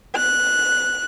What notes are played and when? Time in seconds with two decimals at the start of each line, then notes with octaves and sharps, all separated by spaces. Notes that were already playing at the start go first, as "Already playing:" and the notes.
0.16 F#6